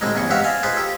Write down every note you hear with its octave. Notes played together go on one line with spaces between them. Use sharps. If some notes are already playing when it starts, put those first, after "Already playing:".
A2 D3 G3 G#3 C4 D#4
E2 G2 C#3 G#4 C#6
G#2 C4 F#4 G4 E5 F5
D5 D#5 F5 G#5 A5
D#4 F4 G#4 B4 C5
G4 A4